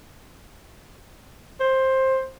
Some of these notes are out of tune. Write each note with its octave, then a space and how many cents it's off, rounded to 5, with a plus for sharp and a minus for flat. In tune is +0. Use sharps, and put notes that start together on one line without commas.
C5 +15